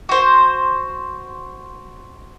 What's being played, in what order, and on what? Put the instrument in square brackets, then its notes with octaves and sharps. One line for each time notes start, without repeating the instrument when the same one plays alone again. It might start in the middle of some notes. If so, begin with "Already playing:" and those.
[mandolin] F#4 C5